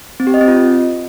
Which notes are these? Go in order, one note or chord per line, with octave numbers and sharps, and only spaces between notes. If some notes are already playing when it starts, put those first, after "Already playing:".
C4
G4
D#5
C4
F4